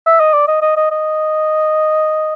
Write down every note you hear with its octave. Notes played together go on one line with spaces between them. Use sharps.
E5
D#5
D5
D#5
D#5
D#5
D#5